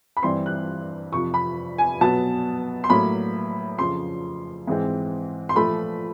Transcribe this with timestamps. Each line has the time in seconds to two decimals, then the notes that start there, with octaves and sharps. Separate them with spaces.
0.17 B5
0.23 G2 E3 G3 C4 C6
0.46 F#6
1.12 F2 C3 F3 C#6
1.34 B5
1.78 G#5
2.01 B2 F#3 B3 A5
2.84 C6
2.90 A2 F#3 A#3 B5
3.78 F2 C#3 F3 C6
4.67 G#2 E3 G#3 C4
5.49 C6
5.56 A#2 F3 A3 B5